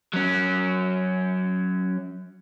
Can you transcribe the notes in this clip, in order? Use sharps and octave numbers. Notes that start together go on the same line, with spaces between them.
F#3 C#4